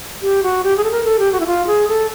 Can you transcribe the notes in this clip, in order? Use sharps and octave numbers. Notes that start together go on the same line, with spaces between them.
G4
F#4
G4
G#4
A4
A#4
A4
G4
F#4
E4
F4
G#4
A4